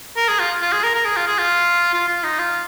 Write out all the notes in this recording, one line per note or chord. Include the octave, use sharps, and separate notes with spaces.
A#4
G#4
F4
F4
G#4
A#4
A#4
G#4
F4
G#4
F4
F4
F4
D#4
F4